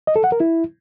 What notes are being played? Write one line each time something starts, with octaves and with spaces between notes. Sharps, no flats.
D#5
A4
F#5
A#4
E4